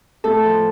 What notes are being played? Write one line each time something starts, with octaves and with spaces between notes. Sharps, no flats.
A2 A4
F3